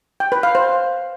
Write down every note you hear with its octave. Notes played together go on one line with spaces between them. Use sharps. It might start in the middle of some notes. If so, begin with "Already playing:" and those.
G5
B4
F5
C5